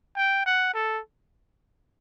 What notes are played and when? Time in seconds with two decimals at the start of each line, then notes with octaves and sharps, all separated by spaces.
0.17 G5
0.46 F#5
0.74 A4